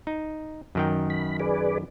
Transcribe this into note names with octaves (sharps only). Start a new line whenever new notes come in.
D#4
F#2 D#3 G5
B5
G#4 B4 D5